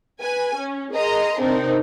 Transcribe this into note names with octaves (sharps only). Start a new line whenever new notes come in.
B4 G#5
C#4
G#4 A#4 D#5 A#5 C6
C3 C4 D4 D#4 A#4 C5